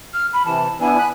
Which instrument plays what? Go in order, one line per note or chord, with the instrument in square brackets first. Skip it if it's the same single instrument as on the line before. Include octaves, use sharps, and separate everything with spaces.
[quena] F6
B5
[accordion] C3 E3 [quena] A5
[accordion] B3 D4 E4 [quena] G#5
[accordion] B5 F#6